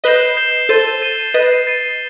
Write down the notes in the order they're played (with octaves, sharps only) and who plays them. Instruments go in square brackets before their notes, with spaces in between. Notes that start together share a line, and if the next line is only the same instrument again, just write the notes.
[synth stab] B4 D#5 [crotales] G6 C7 E7 G7
[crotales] G6 C7 E7 G7
[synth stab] A4 C5 [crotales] A6 D#7 G7
[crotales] A6 D#7 G7
[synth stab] B4 D#5 [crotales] A6 C7 D#7
[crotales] A6 C7 D#7